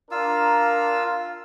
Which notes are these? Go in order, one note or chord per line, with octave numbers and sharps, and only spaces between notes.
D4 F4 A#4 E6